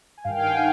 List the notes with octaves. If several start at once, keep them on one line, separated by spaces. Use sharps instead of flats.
G#5
G2 D#3 F5 G5
G#5
G5
F#5